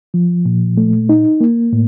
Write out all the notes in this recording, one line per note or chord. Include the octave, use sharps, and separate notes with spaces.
F3
A#2
A3
D#4
A#3
A2